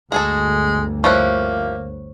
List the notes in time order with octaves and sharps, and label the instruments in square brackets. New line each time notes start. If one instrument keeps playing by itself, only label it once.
[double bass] G1 D2 [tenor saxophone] G#3 [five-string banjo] F#4 G#4 A4
[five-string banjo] F3 G3 E4 [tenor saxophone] A#3 [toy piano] C5 C#5 C#6